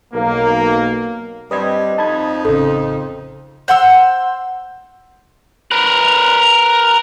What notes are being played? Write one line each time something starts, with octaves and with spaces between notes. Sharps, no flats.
B1 A#3
G2 G3 C4 B4 D#5 B5 G#6
F2 D#4 A5 B5 G#6
A1 C#3 A4
C5 F#5 C6 E6
A#4 B4